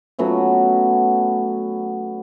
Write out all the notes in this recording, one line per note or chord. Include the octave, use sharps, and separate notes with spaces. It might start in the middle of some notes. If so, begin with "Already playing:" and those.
F#3 A3 B3 C#4